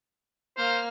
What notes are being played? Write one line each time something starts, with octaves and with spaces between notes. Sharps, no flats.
A#3 C5 F6